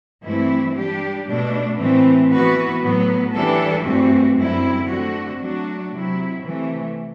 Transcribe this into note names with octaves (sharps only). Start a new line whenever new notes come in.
G2 E3 A3 C4 E4
G3 D4 G4
B2 A3 D4
A2 E3 A3 C4
E3 B3 F#4 B4
A2 F#3 B3
E3 G3 D4 A4
G2 E3 A3 C4 F#4
F#2 D3 G3 C4 E4
D3 A3 C4 F#4
F#3 A3 D4 F#4
C3 F#3 C4 E4
C3 E3 A3